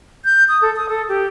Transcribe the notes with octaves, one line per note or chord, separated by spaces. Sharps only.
G6
D#6
A4
D#6
A4
G4